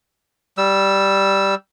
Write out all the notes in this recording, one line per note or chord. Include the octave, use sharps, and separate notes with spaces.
G3 E6